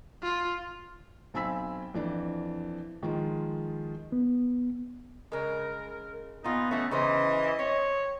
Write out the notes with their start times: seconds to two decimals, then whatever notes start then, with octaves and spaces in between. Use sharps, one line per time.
0.23 F4
1.34 B1 C4 G#5 B5 E6 B6
1.94 F2 E3 D4
3.03 D#3 F3 G#3 F4
4.12 B3
5.32 C#3 G#3 A#4
6.44 A#2 B3 D#4 F4
6.71 E3 A3 C#4
6.91 C#3 E3 C#4 C5 D#5
7.59 C4 C#5